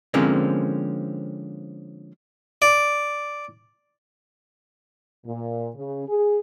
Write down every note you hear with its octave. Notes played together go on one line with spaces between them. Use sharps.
D3 F3 G#3 A#3 C4 C#4
D5
A#2
C#3
G#4